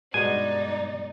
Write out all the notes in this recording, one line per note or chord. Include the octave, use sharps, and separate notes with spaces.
G2 B2 G#3 B3 D#4 D5 G#5